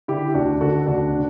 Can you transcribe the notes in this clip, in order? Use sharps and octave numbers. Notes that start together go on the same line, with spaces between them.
D3 E4 G4
D2 D4 F#4
D3 F#4 A4
D2 D4 F#4
D3